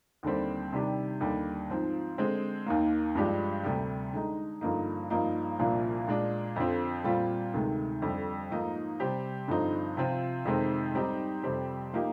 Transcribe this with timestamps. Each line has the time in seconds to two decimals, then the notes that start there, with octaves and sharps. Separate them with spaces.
0.23 D#2 D3 G3 C4
0.72 C3 D#3 G3 D4 G4
1.21 D#2 D3 G3 D4
1.70 G#2 F3 C4 F4
2.18 D3 G#3 C4
2.66 D#2 D#3 A#3
3.15 G2 F3 G#3 D4 G4
3.64 D2 C3 G3
4.13 D3 G#3 D#4
4.61 G2 D3 F3 A#3 D#4
5.10 G2 F3 A#3 D#4
5.59 C2 A#2 F3 A#3 D4
6.08 A#2 G#3 D4
6.56 F2 D3 F3 C4
7.04 A#2 G3 C4 F4
7.54 D2 C3 D#3 G#3
8.02 F2 D3 G3
8.51 G#2 F3 A#3 D#4
9.00 C3 G3 C4 G4
9.48 G2 D3 F3 C4 D#4
9.97 C3 F3 C4 F4
10.45 F2 C3 D#3 G#3 C4
10.94 G#2 G3 C4 D#4 G4
11.43 F2 C3 G3 C4 G4
11.93 F3 A#3 D#4 G4